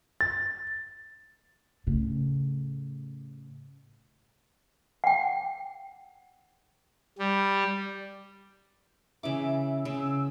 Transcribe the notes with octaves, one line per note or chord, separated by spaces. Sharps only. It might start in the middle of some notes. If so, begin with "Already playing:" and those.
A6
A2 C#3
F#5 G5
G3
C#3 E3 E5 D6
C#3 E6